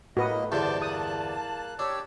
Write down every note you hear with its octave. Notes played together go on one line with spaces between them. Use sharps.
A2 F#3 A#3 F#4 B4 D#5 D#6
E2 G2 D3 C5 A5 D6 G6
A#3 D#6 F#6
D4 G4 C#5 E6